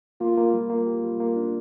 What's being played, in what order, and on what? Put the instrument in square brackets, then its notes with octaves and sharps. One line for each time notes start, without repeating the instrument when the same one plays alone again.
[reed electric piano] A#3 [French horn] F4
[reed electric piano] A#3
G3
[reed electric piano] A#3 [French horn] F4
[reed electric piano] G4
G3
A#3
D4